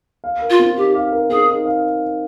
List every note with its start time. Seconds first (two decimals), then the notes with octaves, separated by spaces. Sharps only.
0.24 F5
0.42 A#4
0.50 F4
0.60 C4
0.77 D#4 G4
0.95 F5
1.12 A#4
1.30 C4 G#4
1.47 D#4
1.66 F5